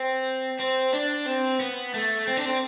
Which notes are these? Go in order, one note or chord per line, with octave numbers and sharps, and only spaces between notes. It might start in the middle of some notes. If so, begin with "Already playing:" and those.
Already playing: C4
C4
D4
C4
B3
A3
C4
D4
C4